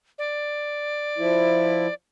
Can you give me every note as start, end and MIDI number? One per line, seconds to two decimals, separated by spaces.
0.18 1.94 74
1.18 1.87 53
1.18 1.87 64